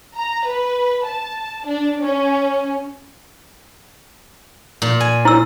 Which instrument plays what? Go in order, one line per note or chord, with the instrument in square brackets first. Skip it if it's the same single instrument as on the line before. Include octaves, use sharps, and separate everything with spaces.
[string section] A#5
B4
A5
D4
C#4
[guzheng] A#2
G#5
[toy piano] E4 E6